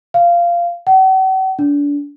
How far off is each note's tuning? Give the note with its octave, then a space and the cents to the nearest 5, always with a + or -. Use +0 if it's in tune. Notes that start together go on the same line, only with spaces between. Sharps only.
F5 -15
F#5 +45
D4 -30